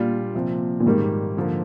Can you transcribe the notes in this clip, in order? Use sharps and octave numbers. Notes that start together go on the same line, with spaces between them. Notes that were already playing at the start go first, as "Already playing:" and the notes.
Already playing: A#2 G3 D4 F4
C3 F3 C4
A#2
G#2 D#3 G3 A#3
D3 F3 A#3